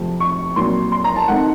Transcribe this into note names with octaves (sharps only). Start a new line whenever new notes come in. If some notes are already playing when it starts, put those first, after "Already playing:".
Already playing: F2 C3 F3 A3
C#6
A#2 F#3 C4 C6
C6
A#5
A5
D#3 A3 C4 D#4 F#5